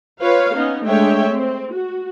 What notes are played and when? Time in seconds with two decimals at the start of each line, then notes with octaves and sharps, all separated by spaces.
0.20 F4 B4 C#5 F5
0.53 B3 C#4 D#4
0.86 G#3 A3 D4 C#5 E5 G5
1.29 C4
1.73 F#4